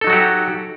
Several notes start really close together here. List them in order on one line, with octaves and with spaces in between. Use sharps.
A4 D#4 F#3 F#4 G4